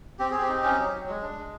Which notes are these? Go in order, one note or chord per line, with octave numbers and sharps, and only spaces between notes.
C4 G4
C4 G#4
G4
D#4
C#4
F#3
F#3
G#3
D4
G#3